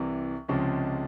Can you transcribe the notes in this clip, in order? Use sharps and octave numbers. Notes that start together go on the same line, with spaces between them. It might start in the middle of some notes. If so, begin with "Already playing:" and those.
Already playing: C2 C3 E3
C#2 C3 F3 G#3 C#4